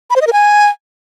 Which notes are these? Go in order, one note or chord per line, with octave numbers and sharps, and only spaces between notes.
B5
C5
D#5
A#4
G#5